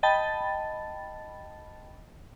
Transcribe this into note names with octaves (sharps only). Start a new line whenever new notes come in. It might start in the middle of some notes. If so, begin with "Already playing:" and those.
D#5 G5 A5 B5 A6